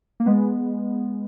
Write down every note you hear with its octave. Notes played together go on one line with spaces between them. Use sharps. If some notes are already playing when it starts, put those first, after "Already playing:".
A#3
G#3 B3